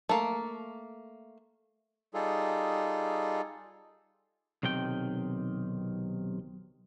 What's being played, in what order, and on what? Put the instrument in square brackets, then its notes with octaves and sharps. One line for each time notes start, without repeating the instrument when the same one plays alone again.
[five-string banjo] A3 A#3
[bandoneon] G3 D#4 F4 G#4 A4
[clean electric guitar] B1 C3 D#3 G5